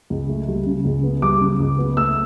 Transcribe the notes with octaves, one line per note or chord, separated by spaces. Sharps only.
C#2
A3
G3
C#3
C#2
B3
G3 D6
C#3
C#2
B3
A3 E6